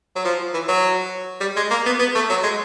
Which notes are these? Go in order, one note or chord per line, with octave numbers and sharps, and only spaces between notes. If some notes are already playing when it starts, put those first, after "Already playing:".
F#3
F3
E3
F#3
G3
G#3
A#3
B3
B3
A3
F#3
G#3